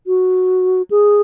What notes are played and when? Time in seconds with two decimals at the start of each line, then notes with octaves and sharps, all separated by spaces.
0.07 F#4
0.91 G#4